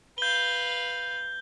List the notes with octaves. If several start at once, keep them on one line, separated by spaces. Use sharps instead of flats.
B4 F5 G6 G7